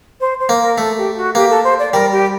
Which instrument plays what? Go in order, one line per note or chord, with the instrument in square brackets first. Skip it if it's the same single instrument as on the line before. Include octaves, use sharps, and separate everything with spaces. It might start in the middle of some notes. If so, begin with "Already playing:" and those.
[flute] C5
C5
[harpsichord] A#3
[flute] A#4
[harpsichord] A3 [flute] A4
[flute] G4
F#4
[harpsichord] A#3 [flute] G4
[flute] A4
C5
D5
[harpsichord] G3 [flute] A#4
[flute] G4